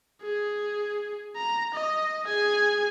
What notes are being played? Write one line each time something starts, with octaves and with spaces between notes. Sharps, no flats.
G#4
A#5
D#5
G#4 G#5